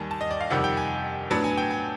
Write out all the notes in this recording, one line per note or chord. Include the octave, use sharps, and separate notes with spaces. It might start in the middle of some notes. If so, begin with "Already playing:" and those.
Already playing: D#2 D#3 G3 G#5 A5
A5
D#5
D5
F5
F2 C3 D#3 G3 F#5
G5
G#5
A2 F#3 B3 D4 A5
G#5
G5
G#5